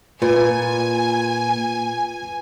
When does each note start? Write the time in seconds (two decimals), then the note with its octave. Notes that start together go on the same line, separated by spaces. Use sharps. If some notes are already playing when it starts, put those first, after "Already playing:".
0.22 A#2 F4 B4 G#5